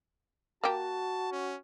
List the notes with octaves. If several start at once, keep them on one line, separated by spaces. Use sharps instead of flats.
A#3 F#4 G4 A5
C#4